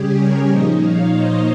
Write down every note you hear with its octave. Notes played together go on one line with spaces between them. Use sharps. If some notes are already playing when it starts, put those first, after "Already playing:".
Already playing: C#3 G3 C#4 G4 G#4
A#4 C#5
A#2 F3 A#3 D#4 C5 D#5
C#5 F5
C5 D#5